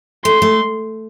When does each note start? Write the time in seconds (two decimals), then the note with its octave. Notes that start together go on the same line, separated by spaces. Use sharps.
0.24 A3 C6
0.42 A3